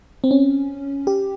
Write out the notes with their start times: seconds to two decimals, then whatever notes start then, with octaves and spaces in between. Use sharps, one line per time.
0.24 C4
0.31 C#4
1.07 G4